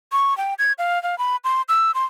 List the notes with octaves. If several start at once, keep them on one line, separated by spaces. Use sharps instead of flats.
C#6
G5
G#6
F5
F5
B5
C6
E6
C6